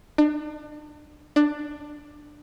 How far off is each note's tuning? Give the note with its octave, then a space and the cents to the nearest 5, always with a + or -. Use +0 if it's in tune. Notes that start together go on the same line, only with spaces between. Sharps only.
D4 +35
D4 +15